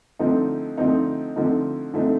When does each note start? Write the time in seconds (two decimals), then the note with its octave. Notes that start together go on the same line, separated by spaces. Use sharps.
0.19 D3 F3 A3 C4 D#4
0.77 D3 F3 A3 C4 D#4
1.36 D3 F3 A3 C4 D#4
1.94 D3 F3 A3 C4 D#4